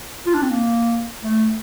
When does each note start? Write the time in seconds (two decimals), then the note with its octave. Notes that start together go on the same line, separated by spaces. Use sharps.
0.27 F4
0.34 D4
0.43 C4
0.51 A#3
1.24 A3